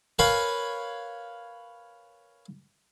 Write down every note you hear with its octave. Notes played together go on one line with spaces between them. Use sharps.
A#4 B4 C#5 F5 G#5 B5